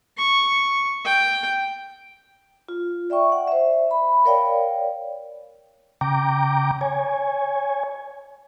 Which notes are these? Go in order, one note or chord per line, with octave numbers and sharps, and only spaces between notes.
C#6
G5
F4
D5 E5 G5 C#6
D5 F#5
C5 E5
B5
A#4 C#5 D5 F5 G5
C#3 G5 A#5 D6
C#5 G#5